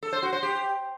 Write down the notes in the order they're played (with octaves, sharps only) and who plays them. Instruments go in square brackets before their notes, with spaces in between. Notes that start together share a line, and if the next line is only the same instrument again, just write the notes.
[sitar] A4
C5
F#4
C5
G4